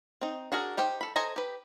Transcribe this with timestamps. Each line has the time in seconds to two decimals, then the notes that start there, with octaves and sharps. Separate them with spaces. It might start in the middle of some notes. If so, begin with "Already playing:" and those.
0.21 C4 D#4
0.52 D4 F#4 G#4 A#4
0.77 D#4 G4 C5 G5
1.01 A4 B5
1.16 A4 C5 D#5 G#5 A#5
1.36 G4 B4